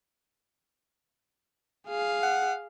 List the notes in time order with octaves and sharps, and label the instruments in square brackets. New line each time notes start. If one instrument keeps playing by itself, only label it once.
[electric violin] G#4 F5
[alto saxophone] F#5